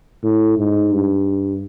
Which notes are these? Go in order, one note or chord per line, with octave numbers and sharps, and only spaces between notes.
A2
G#2
G2